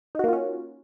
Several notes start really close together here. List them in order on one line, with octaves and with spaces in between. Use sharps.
D#4 F#4 A#3 F4 C#4